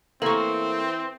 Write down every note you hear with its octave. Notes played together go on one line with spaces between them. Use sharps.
E3 A3 A#3 C4 A4 C#6